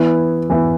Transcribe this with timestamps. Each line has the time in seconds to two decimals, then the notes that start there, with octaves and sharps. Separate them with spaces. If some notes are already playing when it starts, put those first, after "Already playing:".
Already playing: E3 B3 E4
0.50 E3 B3 E4